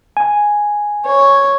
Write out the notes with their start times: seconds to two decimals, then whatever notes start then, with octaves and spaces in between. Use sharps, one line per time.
0.17 G#5
1.06 C#5